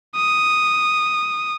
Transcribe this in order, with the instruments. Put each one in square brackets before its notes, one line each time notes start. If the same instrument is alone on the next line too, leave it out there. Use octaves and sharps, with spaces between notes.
[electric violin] D#6